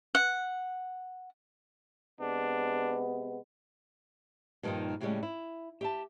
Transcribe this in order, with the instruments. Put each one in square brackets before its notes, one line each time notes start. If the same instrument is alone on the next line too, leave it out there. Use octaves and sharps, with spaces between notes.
[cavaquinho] F#5
[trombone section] C3 G#3 B3 [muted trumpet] D4
[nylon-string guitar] G2 A#2 D#3 F3 D#4 F4
A2 C#3 G3 G#3 C#4
E4
G4 E5 A5